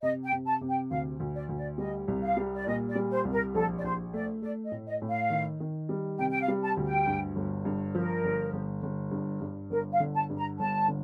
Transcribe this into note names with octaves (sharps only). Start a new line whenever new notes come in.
C3 D#5
G5
C3
A5
C3
G5
D2 F5
D2
D5
D2
D5
G3 D#5
C2
F5
G3
D5
A#2 D#5
D5
G3
C5
C2
A#4
A#1 A4
D5
A#1 C5
A3 D5
A3 D5
D#5
A2
D#5
A2
F5
D#3
D#3
G3
C3 G5
G5
F5
G3
A5
D2
G5
G2
G1
G2
F3 A#4
G1
G1
G1
G2
G2
G1 A#4
F5
D3
A5
G2
A#5
G1 A5
D3